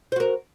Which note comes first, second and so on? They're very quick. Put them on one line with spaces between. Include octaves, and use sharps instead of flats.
C5 F#4 A#4